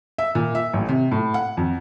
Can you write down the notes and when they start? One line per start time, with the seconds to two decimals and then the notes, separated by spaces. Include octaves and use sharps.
0.18 E5
0.35 A#2
0.55 E5
0.73 A1
0.89 C3
1.12 A2
1.34 F#5
1.57 F2